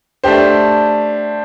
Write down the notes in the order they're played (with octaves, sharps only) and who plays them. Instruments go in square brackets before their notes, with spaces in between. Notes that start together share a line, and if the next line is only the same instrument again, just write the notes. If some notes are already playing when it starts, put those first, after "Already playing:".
[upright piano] A3 D4 G4 C5